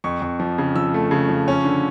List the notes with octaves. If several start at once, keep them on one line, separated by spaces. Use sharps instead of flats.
F2 C#6
F2
F3
C#3
F3 E6
A3
C#3
F3
C#4
D3